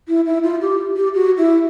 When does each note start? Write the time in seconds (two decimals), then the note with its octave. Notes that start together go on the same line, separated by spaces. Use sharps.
0.08 E4
0.26 E4
0.43 F4
0.61 G4
0.96 G4
1.14 F#4
1.37 E4